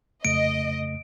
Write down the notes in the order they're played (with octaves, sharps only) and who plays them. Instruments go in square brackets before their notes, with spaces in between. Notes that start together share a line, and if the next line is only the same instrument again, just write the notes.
[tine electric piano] F2 C#3 A3 [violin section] D#5 [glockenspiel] D7